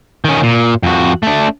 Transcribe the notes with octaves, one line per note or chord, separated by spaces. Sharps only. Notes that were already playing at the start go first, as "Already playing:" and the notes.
D#3 C#4
A#2
F2 F#4
A3 D4